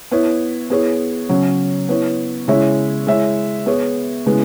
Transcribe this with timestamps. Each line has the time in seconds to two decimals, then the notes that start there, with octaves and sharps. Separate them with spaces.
0.11 B3 E4 C#5
0.70 B3 E4 G#4 C#5
1.29 C#3 F#3 C#4
1.89 B3 E4 C#5
2.48 C#3 G#3 E4 C#5 E5
3.07 G#3 E4 C#5 E5
3.66 B3 G#4 C#5
4.26 C#3 G#3 B3 E4